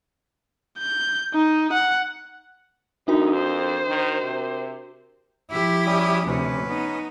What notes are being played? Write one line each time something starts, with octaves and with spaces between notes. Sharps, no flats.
G6
D#4
F#5
F2 D4 D#4 F#4 A#4
C5
D#3
C3
F3 E4 G4 E5
G3 C#4 D#6
D2 C3 C#4 B4
B3 D#4